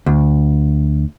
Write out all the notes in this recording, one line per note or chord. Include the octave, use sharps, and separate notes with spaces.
D2